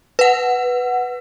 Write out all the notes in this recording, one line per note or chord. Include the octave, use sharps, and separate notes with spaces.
B4 F#5